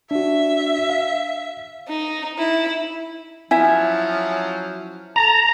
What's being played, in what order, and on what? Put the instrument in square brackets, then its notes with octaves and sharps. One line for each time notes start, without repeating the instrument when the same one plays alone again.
[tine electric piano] D4 F#4 [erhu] E5
[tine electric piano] F5
[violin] D#4
E4
[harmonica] F3 F#3 C#4 [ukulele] E4 E5 [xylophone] G#5
[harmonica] A4 A5 [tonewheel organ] A#5